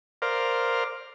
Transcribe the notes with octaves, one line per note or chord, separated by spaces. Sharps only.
A#4 C5 D5 F5